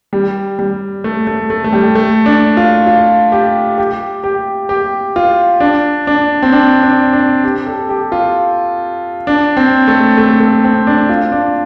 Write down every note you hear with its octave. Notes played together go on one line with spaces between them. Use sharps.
G3
G3
A3
A3
A3
A3
G3
A3
D4
F4
F4
G4
G4
G4
G4
F4
D4
D4
C4
D4
D4
D4
G4
A4
G4
F4
D4
C4
A3
A3
A3
C4
D4
F4
D4